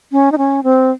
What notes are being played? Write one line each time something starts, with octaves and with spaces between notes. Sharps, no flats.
C#4
D#4
C#4
C4